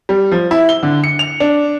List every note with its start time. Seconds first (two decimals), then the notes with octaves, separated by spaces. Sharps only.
0.09 G3
0.32 F3
0.51 E4
0.69 G7
0.83 D3
1.04 C#7
1.19 F7
1.40 D4